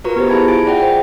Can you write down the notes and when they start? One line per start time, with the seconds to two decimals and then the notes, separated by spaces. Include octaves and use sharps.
0.04 F4 F#4 A#4 B4 A#5 C#6
0.16 B3 G4 C5
0.29 E4 G#4 E5 A5 B5 G#6
0.48 F4 G#5 A6 D7
0.65 F4 G#4 D5 E5 F#5 G5
0.80 C5 G5